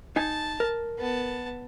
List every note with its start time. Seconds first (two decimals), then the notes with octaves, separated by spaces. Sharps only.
0.16 D#4 G#5 A5
0.60 A#4
0.98 B3 A5